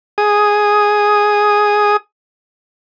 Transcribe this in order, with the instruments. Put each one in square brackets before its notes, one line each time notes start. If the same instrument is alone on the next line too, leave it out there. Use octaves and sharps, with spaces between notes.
[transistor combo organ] G#4 D#6